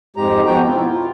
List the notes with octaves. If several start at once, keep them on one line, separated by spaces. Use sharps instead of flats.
F2 G#2 G#3 G4 A#5
B2 F3 B3 F#4 G5 A#5
C4 E4 F4
F4